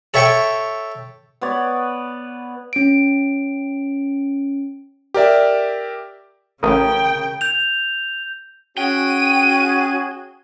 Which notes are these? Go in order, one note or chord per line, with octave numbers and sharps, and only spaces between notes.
A4 C#5 E5 G5 C#6
B3 B4 C#5 D5
C#4 D7
G4 A#4 D5 E5
A1 C#3 A#4 G5 D#6
G6 F7
C#4 F#4 G#4 G5 D#7